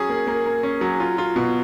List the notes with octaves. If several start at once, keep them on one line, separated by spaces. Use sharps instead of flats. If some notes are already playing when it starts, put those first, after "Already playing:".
Already playing: F#3 C#4 G#4
A#3
A#3
A#3
C#4
F#3
F4
F4
B2